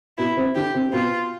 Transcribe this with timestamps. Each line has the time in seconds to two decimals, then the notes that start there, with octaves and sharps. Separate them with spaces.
0.18 B2 B3 E4
0.37 C3 C4
0.55 D3 D4 G4
0.74 C3 C4
0.89 C4
0.93 B2 B3 F4